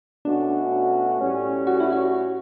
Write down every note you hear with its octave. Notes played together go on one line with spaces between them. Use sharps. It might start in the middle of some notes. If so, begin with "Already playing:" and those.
B2 A3 C#4 D4 F#4
A2 G3 C#4
F#4
E4
F#4